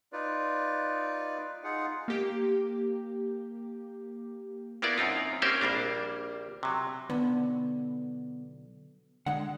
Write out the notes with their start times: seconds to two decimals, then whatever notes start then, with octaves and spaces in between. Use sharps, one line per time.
0.13 D#4 F4 B4 D5
1.64 D#4 F4 G#4 F#5
2.08 A#3 G4
4.82 A#3 B3 E4 F4 A#4 D5
4.98 F#2 C4 D#4 F4
5.42 A#3 C4 C#4 G4 A#4 C5
5.61 A#1 G3 A#3 D4
6.63 C3 F#3
7.10 B1 D3 B3
9.26 C2 D3 G#3 F#5